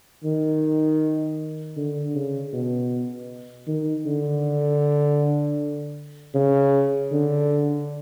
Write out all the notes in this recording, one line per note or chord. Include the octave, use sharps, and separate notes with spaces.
D#3
D3
C#3
B2
D#3
D3
C#3
D3